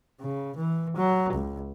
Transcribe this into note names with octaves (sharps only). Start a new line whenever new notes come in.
C#3
E3
F#3
C#2